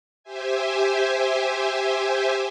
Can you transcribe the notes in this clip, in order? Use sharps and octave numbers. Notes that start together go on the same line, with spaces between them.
G4 C5 E5 G#5